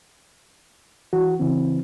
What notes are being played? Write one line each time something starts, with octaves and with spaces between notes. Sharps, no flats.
E3 F#4
C#3 E3 C4